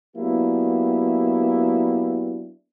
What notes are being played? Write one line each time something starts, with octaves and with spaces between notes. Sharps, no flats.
F#3 A#3 B3 D4 E4 G4